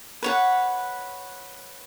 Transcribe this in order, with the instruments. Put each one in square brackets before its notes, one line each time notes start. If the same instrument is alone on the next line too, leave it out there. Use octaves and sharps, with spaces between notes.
[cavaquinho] B4 C#5 F#5